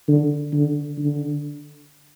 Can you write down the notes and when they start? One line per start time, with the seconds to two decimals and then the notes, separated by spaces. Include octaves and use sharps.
0.08 D3
0.53 D3
0.98 D3